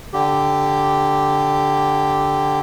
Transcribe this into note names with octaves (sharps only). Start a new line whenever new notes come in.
D3 G4